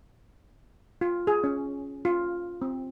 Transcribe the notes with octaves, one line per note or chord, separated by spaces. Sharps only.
F4
G#4
C#4
F4
C4